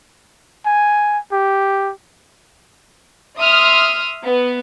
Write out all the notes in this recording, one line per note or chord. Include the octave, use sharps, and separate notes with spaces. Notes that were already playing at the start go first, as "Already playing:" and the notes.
G#5
G4
E5 C6 D#6 F6
B3